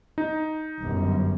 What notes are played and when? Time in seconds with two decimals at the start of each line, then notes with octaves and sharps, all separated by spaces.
0.18 D#4
0.80 G1 F#2